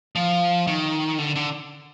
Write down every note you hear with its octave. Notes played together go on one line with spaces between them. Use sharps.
F3
D#3
D3
D3